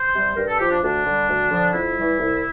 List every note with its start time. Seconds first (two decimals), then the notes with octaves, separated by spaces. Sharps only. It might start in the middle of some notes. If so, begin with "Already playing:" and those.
Already playing: C5
0.14 C3 G3
0.37 G2 A#4
0.48 A4
0.59 F3 G4
0.70 D4
0.82 D2 D4
1.04 D3 G3
1.28 D2
1.50 D3 F3
1.74 F2 E4
1.97 E3 G3
2.19 C2